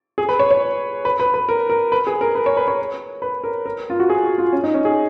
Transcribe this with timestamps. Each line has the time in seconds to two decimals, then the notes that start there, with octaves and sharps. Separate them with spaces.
0.18 G#4
0.29 B4
0.39 C#5
0.51 C#5
1.05 B4
1.20 B4
1.34 B4
1.49 A#4
1.70 A#4
1.92 B4
2.07 G#4
2.21 A#4
2.35 B4
2.46 C#5
2.57 B4
2.68 C#5
3.22 B4
3.44 A#4
3.66 A#4
3.90 F4
4.00 F#4
4.10 G#4
4.24 F#4
4.38 F4
4.53 C#4
4.64 D#4
4.74 C#4
4.85 G#4